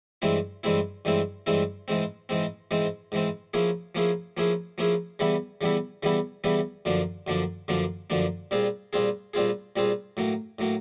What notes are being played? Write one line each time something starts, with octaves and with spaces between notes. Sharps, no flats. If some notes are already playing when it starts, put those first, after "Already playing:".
G2 E3 G#3 C4 E4
G2 E3 G#3 C4 E4
G2 E3 G#3 C4 E4
G2 E3 G#3 C4 E4
G#2 E3 G#3 C4
G#2 E3 G#3 C4
G#2 E3 G#3 C4
G#2 E3 G#3 C4
F3 A#3 C#4 E4 G#4
F3 A#3 C#4 E4 G#4
F3 A#3 C#4 E4 G#4
F3 A#3 C#4 E4 G#4
C#3 E3 G3 B3 E4
C#3 E3 G3 B3 E4
C#3 E3 G3 B3 E4
C#3 E3 G3 B3 E4
F#2 D3 F3 A#3 D4
F#2 D3 F3 A#3 D4
F#2 D3 F3 A#3 D4
F#2 D3 F3 A#3 D4
A#2 G3 C4 F4 G#4
A#2 G3 C4 F4 G#4
A#2 G3 C4 F4 G#4
A#2 G3 C4 F4 G#4
A2 F#3 A#3
A2 F#3 A#3